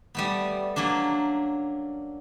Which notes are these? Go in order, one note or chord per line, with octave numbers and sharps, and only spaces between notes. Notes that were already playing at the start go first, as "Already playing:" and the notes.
G3 A3 B3
F#3 A#3 C#4 D4